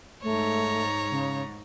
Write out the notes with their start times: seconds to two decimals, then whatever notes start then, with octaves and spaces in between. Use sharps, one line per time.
0.23 G#2 A3 C#5 A#5
1.10 C#3